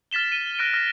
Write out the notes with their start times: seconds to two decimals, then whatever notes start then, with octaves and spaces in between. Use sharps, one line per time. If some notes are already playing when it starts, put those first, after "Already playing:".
0.11 F6 A6 B6 E7 G7
0.32 D#7
0.59 F6 F#6 A#6 D7
0.73 F6 A#6